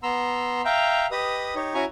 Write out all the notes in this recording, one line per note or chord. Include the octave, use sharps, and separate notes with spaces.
B3 A#5 C6 E6
E5 F5 G5 A#5
G4 B4 D#5 D#6
D#4 G4 C#5
C#4 E4 F#4 G#5 A#5 C#6